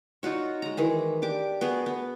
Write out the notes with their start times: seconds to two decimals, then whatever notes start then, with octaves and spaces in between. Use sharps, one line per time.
0.23 D#4 F4 F#4 C#5
0.62 G#3 A#5
0.77 D#3 E3 G#4
1.22 D4 G4 D6
1.61 B3 F#4 G#4
1.86 B3